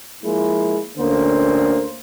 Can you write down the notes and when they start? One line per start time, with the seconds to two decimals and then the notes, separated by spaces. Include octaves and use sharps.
0.24 F3 G#3 A#3 E4
0.98 D2 D3 A#3 C#4 C5